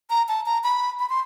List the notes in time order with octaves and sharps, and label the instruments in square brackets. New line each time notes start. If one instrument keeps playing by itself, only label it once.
[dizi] A#5
A5
A#5
B5
B5
C6